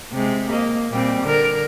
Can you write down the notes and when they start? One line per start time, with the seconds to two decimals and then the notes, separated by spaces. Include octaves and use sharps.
0.12 C3 G#3
0.50 A#3 D#5
0.90 A#2 G3 C4
1.23 D3 A#4